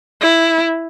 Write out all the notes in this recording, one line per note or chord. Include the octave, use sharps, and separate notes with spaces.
E4